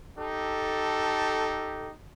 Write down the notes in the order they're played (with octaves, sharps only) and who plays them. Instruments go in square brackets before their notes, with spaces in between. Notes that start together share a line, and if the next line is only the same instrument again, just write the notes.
[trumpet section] D#4 G4 A4